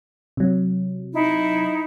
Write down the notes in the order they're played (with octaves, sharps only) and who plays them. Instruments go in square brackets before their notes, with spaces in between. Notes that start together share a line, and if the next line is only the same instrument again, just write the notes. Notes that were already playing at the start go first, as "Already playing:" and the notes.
[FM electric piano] C3 F#3
[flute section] D#4 E4